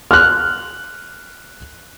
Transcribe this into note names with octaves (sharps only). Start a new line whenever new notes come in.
F6 F#6